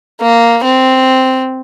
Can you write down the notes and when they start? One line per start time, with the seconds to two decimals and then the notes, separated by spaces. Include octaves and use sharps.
0.21 A#3
0.64 C4